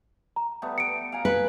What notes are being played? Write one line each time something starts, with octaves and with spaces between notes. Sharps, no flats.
A#5
G3 A3 B3
C#7 D7
F5 G#5 A#5
B4